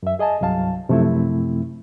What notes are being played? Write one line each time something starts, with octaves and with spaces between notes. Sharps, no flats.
F#2 E5
G#4 D#5 G#5 A5
C2 G2 F#3 F5 A5
F#2 C3 F3 A3 C4 E4